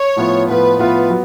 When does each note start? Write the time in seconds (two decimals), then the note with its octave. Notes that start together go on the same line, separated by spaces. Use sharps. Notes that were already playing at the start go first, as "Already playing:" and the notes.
Already playing: C#5
0.16 A2 F3 B3 F4
0.47 A2 F3 B3 F4 B4
0.78 A2 F3 B3 F4 B4
1.10 F#3 B3